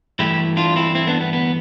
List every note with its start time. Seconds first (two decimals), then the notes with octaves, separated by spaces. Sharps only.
0.19 G2 E3 A3 E4 G4
0.57 D4 F4
0.76 C4 E4
0.95 C4 E4
1.07 B3 D4
1.20 B3
1.33 B3